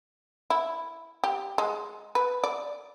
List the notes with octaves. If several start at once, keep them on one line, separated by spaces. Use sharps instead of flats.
E4
G4
G#3
B4
D5